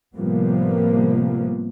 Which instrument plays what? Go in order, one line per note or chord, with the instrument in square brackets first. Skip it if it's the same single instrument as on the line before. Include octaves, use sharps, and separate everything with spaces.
[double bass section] A2 C3 F3 G3 A#3 B3